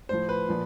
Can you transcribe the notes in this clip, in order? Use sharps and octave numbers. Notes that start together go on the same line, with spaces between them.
A2 F3 C5
B4
A#2 F3